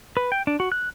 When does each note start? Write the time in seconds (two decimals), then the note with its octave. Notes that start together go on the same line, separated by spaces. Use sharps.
0.17 B4
0.32 G5
0.47 D4
0.60 F#4
0.72 F#6